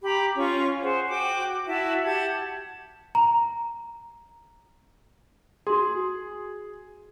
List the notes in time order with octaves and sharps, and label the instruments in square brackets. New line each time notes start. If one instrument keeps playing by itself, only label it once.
[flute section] G4 A#5 B5
C#4 F4 C#6
G#4 C5 F#5
F#4 G5 D6
E4 F#4 E5 A5
G4 F#5 A5 G#6
[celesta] A#5
[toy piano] F#4 C6 [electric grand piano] G#4